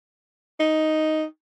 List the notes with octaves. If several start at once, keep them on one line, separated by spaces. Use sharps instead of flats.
D#4